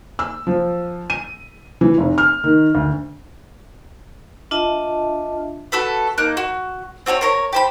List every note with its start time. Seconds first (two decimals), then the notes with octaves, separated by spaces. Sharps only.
0.19 E6
0.47 F3
1.10 D#7
1.81 E3
1.98 F1
2.18 F6
2.44 D#3
2.75 D2
4.51 D4 F4 D#5 E5 A5
5.72 F#4 A4 B4
6.18 A#3 D#4 F#6
6.37 F#4
7.06 C4 F#4 A#4 C#5
7.21 A#4 C#5 A#5
7.53 G4 C5 B5